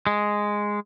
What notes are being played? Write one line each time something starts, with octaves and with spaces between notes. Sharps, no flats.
G#3